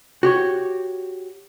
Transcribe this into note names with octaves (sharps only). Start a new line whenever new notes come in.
F#4 G4 C#5